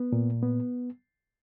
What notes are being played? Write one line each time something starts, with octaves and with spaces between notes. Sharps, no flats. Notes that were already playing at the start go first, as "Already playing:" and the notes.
Already playing: B3
A#2
B3